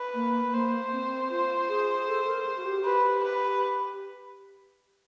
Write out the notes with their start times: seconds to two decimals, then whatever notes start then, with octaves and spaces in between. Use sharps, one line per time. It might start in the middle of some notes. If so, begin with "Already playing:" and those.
Already playing: B4
0.14 A#3
0.53 A#3 C5
0.92 C4
1.30 F4 C5
1.69 G#4
2.07 A4
2.27 A#4
2.46 G#4
2.57 F#4
2.65 G4
2.85 G4 B4
3.23 B4